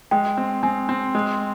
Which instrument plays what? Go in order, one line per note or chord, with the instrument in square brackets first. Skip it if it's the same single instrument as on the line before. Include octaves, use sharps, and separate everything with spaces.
[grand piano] G#3 [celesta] G5
[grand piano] C4
[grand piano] C4 [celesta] G#5
[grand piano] C4
G#3